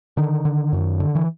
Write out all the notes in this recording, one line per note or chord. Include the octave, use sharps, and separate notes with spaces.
D3 D#3
D3
F#2
D3
E3